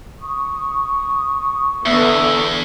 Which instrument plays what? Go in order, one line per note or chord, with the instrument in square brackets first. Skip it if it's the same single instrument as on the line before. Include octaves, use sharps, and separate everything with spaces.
[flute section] C#6 D#6
[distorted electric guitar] E2 [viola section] D3 B3 [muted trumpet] E5